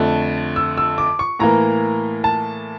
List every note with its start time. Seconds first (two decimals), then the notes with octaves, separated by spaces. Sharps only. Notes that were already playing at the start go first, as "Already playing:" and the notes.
Already playing: F2 D3 A3
0.56 E6
0.78 E6
0.98 D6
1.19 C#6
1.39 A2 E3 A#3 A#5
2.24 A5